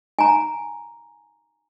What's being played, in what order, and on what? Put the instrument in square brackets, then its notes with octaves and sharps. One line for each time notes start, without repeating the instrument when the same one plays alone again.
[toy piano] G#5 A#5